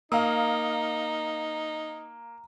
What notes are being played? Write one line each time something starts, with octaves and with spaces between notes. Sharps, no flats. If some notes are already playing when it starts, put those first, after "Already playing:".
A#3 D#4 F5 A#5 D#6